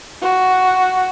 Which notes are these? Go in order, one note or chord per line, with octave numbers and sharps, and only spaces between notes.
F#4